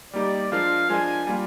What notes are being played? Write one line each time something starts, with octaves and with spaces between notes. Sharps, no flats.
G3 A#3 D#4 G4 D5
F3 G#3 D4 F4 A#4 F5
F3 G#3 D4 F4 A#4 G#5
G3 A#3 F4